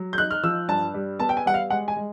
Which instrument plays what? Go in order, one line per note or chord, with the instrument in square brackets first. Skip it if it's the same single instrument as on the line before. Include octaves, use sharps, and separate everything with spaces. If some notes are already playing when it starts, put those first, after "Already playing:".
Already playing: [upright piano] F#3
G6
D#4 F#6
F6
F3 E6
G2 A5
G3
B3 A5
G5
G#5
G3 F#5
F5
G#3 F#5
G#5
G#3